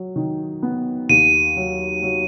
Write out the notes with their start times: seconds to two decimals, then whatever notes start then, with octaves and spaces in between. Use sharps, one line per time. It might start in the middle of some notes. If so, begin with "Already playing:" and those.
Already playing: F#3
0.16 D#3
0.63 B3
1.09 D#2 D#7
1.56 F#3
2.03 F#3